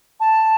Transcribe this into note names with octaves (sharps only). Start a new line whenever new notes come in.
A5